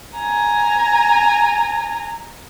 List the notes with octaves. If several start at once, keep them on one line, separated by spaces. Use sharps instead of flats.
G#5 A#5